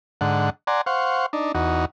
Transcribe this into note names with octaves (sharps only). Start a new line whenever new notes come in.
G#2 D3 F#5
D5 F#5 G#5 A#5 C6
C5 F5 F#5 C#6
D4 D#4
E2 D#4 F#4